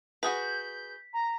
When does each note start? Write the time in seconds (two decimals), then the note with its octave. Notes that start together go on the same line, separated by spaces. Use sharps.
0.23 F#4 G#4 B4 G6 B6
1.13 A#5